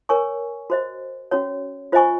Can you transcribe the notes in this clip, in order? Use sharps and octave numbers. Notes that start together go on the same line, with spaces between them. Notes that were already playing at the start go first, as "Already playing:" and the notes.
A#4 C#5 G#5 C#6
F#4 C5 D#5
C#4 F#4 C#5
F4 C5 D#5 G#5 C#6